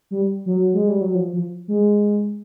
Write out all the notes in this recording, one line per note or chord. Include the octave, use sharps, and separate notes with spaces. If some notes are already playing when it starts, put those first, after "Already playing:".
G3
F#3
G#3
G3
F#3
F3
F3
G#3